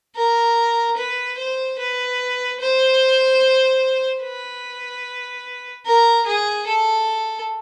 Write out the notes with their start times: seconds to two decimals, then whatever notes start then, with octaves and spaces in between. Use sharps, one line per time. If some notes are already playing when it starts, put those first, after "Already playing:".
0.16 A#4
0.97 B4
1.38 C5
1.78 B4
2.60 C5
4.22 B4
5.86 A#4
6.26 G#4
6.67 A4